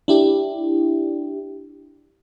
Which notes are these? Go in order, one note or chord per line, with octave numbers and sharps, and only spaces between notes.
D4 E4 G4